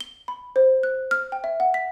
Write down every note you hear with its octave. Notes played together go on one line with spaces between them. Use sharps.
G7
B5
C5
F#6
F6
G5
E5
F#5
B6